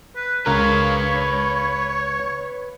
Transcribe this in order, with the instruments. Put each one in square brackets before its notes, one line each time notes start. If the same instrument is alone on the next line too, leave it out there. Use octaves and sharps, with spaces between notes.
[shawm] B4
[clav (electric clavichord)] C#2 A#4 [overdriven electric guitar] B4 F5 [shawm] C#5